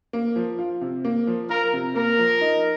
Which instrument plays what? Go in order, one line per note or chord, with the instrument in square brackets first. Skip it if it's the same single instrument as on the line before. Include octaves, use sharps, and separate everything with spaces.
[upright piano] A#3
F3
F4
C3
A#3
F3
[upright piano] F4 [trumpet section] A#4
[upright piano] C3
[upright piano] A#3 [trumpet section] A#4
[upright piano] F3
D#4